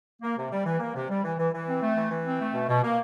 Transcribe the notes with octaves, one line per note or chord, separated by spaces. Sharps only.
A#3
C3
G3
E3
A#3
C3
G3
E3
E3
E3
C4
A3
E3
E3
C4
A3
B2
B2
A#3